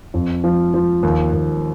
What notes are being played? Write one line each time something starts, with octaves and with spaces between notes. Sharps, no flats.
F2
F3
F3
D#2
D#2